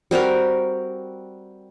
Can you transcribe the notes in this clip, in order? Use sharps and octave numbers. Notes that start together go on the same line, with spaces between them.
G3 C4 F#4 A#4